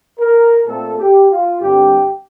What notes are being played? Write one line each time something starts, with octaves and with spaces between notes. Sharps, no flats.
A#4
A#2 A3 C4 A4
G4
F4
G2 D3 G3 C4 G4